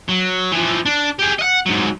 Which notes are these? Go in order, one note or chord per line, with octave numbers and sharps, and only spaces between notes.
F#3
E3 F3
D4
G4 G#4
D#5 F#5
G#2 F#3